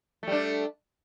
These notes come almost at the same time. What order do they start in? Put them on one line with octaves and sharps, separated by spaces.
A3 G3 D4